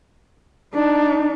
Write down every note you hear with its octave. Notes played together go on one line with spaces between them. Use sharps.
D4 D#4